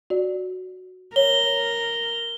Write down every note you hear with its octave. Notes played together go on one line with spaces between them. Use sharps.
F#4 D5
A#4 C#5 G7